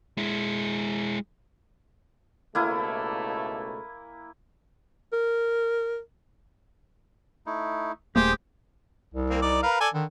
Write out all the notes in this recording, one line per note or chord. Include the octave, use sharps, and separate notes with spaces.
G#3 E4
C#2 B2 A3 A#3 E4 G#5
A#4
A3 D#4 E4
D#1 A3 A#3 G4 G#4 C5 D#6
C2
A#3 C4
D#4 D5
A#4 B4 F5
A4 D5 G#5
D3 D#3